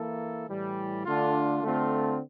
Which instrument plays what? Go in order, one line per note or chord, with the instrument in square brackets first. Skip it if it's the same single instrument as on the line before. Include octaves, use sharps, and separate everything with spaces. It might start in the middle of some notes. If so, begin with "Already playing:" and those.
Already playing: [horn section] E3 A#3 E4 A4
A2 E3 G3
D3 A3 D4 F4
D3 A3 C4 F4